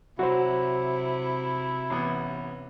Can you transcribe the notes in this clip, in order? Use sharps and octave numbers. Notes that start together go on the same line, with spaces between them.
C3 F#3 E4 F#4 C5
A1 B3